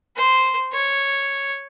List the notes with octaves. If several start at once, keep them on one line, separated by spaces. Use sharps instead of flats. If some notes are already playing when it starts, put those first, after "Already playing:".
C5
C#5